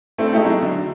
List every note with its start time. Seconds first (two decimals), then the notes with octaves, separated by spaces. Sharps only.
0.18 A3 C4 D4 E4 A4
0.32 G#3 D#4 E4 F#4 G4 A4
0.45 F#3
0.62 D3